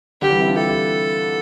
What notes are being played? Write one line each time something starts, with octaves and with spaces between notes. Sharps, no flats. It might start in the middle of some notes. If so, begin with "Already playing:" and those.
D3 G4
E3 G3
C4 E4
D4 F4
E4 G4 A4
E4 G4